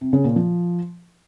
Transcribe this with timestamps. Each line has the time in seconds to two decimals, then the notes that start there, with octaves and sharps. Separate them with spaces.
0.01 C3
0.13 C#3
0.24 A#2
0.36 F3